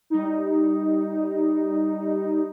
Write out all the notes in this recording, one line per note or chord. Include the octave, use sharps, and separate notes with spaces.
G3 D#4